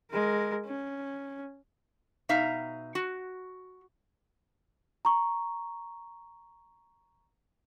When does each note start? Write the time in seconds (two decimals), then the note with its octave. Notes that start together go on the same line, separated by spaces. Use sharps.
0.11 G#3 A#4
0.66 C#4
2.29 B2 D#4 E5 F5 A#5
2.95 F#4
5.05 A#5 C#6